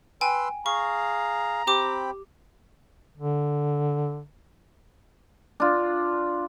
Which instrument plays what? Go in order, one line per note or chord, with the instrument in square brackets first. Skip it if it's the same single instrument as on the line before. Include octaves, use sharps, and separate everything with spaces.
[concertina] B4 C6 E6 [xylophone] G5 G#5
[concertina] G#4 F5 [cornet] A#5 [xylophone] C#6
[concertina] C4 G5 B5 [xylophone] G4 D6
[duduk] D3
[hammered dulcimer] D4 F4